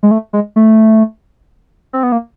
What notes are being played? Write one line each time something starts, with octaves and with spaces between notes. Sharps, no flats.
G#3
A3
G#3
A3
C4
B3
A#3